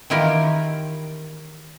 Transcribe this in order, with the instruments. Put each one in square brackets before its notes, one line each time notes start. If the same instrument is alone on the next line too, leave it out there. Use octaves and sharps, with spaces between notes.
[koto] D#3 E3 E4 F4 G4 A#4